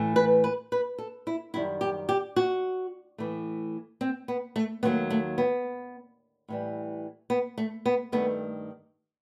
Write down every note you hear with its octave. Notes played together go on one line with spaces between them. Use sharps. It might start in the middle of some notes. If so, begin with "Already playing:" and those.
Already playing: A2 E3 A3
B4
B4
B4
A4
E4
F#2 D#3 G3 E4
G4
G4
F#4
A2 E3 A3
C4
B3
A3
D#2 D#3 F#3 A3 B3
A3
B3
A2 E3 G3
B3
A3
B3
G2 D#3 A3 B3